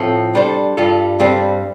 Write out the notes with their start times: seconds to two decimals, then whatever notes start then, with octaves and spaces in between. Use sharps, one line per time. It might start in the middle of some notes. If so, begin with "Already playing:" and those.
Already playing: A2 F3 C4 A4
0.35 G3 D4 A4 C5
0.77 G2 G3 F4 A4
1.20 G2 G3 C4 A4 C5